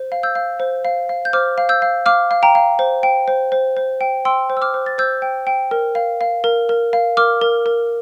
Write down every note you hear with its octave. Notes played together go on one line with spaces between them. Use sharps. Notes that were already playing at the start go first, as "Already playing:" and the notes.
Already playing: C5
F5
E6 G6
F5
C5
F5
F5
G6
C5 D6 F6
F5
E6 G6
F5
F5 D6 F6
F5
G5 A#5
F5
C5
G5
C5
C5
C5
G5
G5 C6 E6
C5
E6
D6 F6
C5
A6
C5 E6 G6
G5
G5
A#4
F5
F5
A#4
A#4
F5
A#4 D6 F6
A#4
A#4